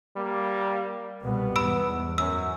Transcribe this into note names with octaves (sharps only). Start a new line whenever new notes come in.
G3 A#3
C2 B2 G3 B3
E2 G#2 B5 E6 D7
F#2 E6